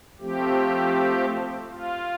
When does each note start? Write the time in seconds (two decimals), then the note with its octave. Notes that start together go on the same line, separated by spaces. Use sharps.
0.20 F3 A3 C4 G4
1.70 F4